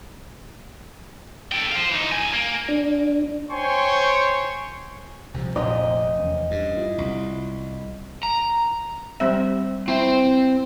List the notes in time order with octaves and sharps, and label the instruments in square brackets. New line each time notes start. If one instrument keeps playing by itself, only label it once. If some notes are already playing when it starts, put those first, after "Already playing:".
[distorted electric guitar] A4 G5
C5 F5
E3 D#4
G2 G#5
A#3
[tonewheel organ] D4
[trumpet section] C5 C#5 G5 G#5 C6 C#6
[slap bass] C2 C3 F3
[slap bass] F1 [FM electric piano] A#2 [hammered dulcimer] D#5
[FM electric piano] E2 C#4
[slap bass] G2
[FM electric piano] E4 F4
[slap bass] C2
[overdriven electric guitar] A#5
[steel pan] G3 C4 E5
[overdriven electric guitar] C4 [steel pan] E4